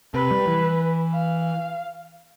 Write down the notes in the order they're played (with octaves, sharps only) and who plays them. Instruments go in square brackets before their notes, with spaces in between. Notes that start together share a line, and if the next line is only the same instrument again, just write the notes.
[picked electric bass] C3 [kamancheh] B4
[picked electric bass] G3
E3
[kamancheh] F5